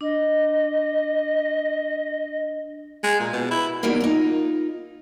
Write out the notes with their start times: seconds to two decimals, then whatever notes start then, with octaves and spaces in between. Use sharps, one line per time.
0.01 D4 D#5
3.04 G#3
3.20 A#2
3.33 B2
3.51 E4
3.83 E2 E3 F#3 G3 A#3 D#4
4.01 D#4 F4